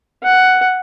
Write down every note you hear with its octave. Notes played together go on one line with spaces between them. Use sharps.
F#5